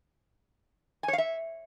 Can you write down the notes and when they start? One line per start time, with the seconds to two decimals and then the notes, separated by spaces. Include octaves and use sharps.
1.03 G#5
1.08 C#5
1.13 F5
1.18 E5